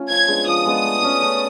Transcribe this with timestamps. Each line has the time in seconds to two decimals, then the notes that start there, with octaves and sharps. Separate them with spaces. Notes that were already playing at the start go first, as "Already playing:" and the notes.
Already playing: A3 C#4 F4
0.09 F3 G#6
0.28 G#3 B3 D4
0.47 F3 D#6
0.66 G#3 B3 D4
0.84 A3
1.02 C#4 F#4 A4
1.22 A3